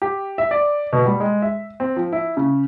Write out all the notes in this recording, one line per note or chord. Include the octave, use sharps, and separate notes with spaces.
G4
E5
D5
B2
G3
G#3
E5
C4
F3
E4
C#3